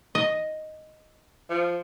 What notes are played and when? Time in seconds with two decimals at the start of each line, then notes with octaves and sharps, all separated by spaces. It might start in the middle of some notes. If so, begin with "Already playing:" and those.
0.15 D#5
1.50 F3